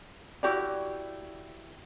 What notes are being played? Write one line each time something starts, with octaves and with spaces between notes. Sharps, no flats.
E4 F#4 G4 D5